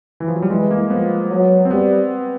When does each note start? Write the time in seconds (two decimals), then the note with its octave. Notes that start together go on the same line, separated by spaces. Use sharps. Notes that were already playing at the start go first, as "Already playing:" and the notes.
0.20 E3
0.28 F3
0.36 F#3
0.42 G3
0.50 E3 G#3
0.71 A#3
0.90 F3 B3
1.30 F#3
1.65 C4
1.71 G3 B3